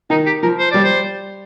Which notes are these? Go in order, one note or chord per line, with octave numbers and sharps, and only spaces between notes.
D#3 D#4
G4
F3 A#4
C5
G3 D5
C5